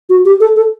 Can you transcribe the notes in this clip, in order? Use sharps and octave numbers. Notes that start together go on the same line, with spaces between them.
F#4
G4
A4
A4